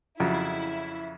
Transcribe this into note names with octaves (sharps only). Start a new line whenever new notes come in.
F2 C#3 F#3 E4